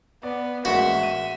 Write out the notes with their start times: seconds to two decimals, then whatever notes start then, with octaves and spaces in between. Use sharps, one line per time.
0.23 B3 D5
0.65 A1 G#3 A#3 F#4 E5
1.03 D#7